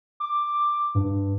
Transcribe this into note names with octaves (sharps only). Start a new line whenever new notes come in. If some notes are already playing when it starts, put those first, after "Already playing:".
D6
G2